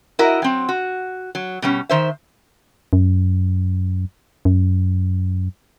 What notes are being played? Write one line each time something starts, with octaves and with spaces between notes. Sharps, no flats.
E4 F#4 A#4 D#5
F#3 C4
F#4
F#3
B2 G3 C#4
D#3 C5 E5
F#2
F#2